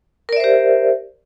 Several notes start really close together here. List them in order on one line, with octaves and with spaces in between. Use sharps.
A#4 D5 E5 C5 G4